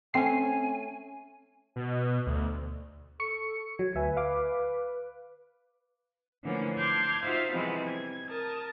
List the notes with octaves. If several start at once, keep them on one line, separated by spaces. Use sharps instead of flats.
A3 C4 C#4 G#5 C7
B2
D2
A4 C#6 C#7
F#3 G#6
D2 B4 E5 G#5
F5 D6
D3 E3 F3 A3 A#3 C#4
A5 C6 D6 F6 G6 G#6
D#4 F4 F#4 C5 E5 F5
C3 E3 F3 G3 G#3 B3
G#6
A#4 A5 D#6